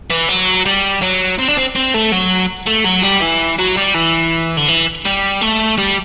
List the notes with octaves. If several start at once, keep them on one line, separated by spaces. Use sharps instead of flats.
E3
F#3
G3
F#3
C4
D4
C4
C4
A3
F#3
A3
F#3
G3
E3
F#3
G3
E3
D3
E3
G3
A3
G3